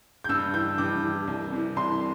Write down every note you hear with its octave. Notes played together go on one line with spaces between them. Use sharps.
G6
G2 E6
E3 G6
G2 D6
E3
C2
C3 E3
C2 C6